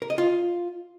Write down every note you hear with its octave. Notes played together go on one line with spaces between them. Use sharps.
A#4
D#5
F4